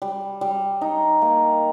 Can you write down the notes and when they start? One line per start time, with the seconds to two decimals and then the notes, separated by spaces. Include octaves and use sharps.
0.02 G3
0.41 G3
0.81 D#4
1.22 A#3